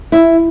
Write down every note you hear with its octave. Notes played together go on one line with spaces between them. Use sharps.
E4